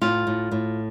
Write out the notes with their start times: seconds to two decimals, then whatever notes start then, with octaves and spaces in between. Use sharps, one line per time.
0.02 A2 F4
0.27 A2
0.51 A2